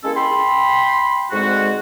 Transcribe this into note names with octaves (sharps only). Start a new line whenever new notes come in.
G#3 A#3 C#4 E4 A4
G5 B5 C6
D2 G#2 G#3 C4 F#4